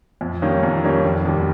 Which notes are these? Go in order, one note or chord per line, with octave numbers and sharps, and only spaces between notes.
F2
D#3 G3 A#3 C#4
F2
D#3 G3 A#3 C#4
F1
D#2 D#3 G3